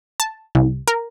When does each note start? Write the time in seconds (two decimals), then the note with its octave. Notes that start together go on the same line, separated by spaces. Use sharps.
0.20 A5
0.55 C2
0.88 A#4